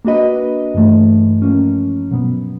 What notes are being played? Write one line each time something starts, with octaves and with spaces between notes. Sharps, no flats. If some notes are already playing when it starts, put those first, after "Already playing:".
A#3 D4 F#4 B4 D#5
G2 E3 A3
F3 A#3 C#4
B2 F#3 B3